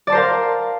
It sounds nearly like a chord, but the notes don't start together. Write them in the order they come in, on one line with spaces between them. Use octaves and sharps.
D5 A5 C5 A#4 F5